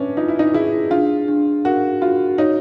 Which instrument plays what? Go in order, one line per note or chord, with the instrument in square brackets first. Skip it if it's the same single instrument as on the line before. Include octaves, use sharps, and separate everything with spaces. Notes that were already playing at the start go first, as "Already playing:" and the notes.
Already playing: [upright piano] C#4 D4 [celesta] B4 E5
[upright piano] D#4 [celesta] F4
[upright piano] E4
D#4
[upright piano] E4 [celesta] G#4
[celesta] D4 [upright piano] F4
[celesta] D4
[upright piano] F#4 [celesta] A#4
[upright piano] F4 [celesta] F#4
[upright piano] D#4 [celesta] C#5